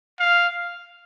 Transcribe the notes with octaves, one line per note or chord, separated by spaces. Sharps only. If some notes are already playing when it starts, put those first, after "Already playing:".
F5